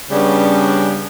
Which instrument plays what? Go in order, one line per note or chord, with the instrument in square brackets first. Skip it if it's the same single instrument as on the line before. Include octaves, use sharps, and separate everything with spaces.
[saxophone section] C#3 G3 B3 C#4 D4